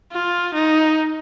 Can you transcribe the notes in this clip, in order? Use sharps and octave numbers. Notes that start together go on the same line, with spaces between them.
F4
D#4